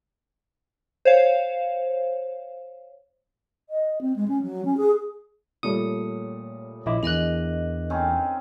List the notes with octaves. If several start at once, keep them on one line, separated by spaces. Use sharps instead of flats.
C5 C#5 F5
D#5
C4
G#3
C#4
F#3
C#4
G#4
A#2 G3 A3 C#5 D#6
A#1 E4 D#5 D6
E2 E3 D4 A#4 D#5 F#6
C4 C#4 D#4